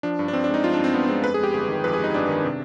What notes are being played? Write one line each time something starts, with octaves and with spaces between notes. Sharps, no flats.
F3 D4
G2
D4
G2 C4
D4
G#3 D#4
F3 F4
D4
G2 C4
G2 B3
G#3 C4
F2 B4
G#4
G#3 G4
G1 G#4
D#3
F2 B4
G#4
G#3 D#4
G1 D4
D#3
C3